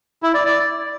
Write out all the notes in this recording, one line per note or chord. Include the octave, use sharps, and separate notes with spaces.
E4
D5
D5